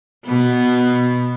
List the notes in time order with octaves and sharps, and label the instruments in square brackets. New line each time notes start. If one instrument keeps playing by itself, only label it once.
[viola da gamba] B2 B3